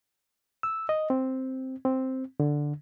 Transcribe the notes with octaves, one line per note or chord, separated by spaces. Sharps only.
E6
D#5
C4
C4
D3